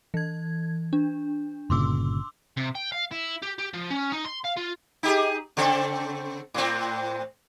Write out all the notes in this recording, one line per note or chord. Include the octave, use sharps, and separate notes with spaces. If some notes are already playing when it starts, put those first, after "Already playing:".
E3 G#6
D4
G1 A#2 C#3 C6 D6 E6
C3
G5
F5
E4
G4
G4
F3
C#4
D#4
C6
F5
F4
D#4 G4 G#4
C#3 C4 A4
A2 C4